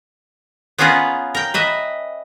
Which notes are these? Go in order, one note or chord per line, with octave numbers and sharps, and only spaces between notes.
B3 C#4 F4 G#4 A#4 B4
A#4 G5
B4 D#5 E5